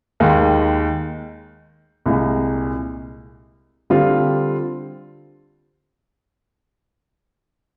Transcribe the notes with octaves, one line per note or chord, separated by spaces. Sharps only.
D#2 D#3 G#3
C2 A#2 G#3
D3 G3 C4 F4